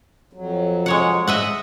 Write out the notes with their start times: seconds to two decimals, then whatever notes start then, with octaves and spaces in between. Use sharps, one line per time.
0.33 F2 F#3
0.86 G#3 C#5 F#5
1.27 D#5 E5 F#5